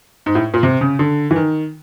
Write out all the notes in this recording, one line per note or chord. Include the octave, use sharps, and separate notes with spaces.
G#2
A2
A#2
C3
C#3
D3
E3
D#3